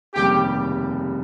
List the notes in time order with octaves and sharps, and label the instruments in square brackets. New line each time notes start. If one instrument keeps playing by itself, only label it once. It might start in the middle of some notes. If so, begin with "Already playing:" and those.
[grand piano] F1 D#2 C#3 G3 [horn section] G4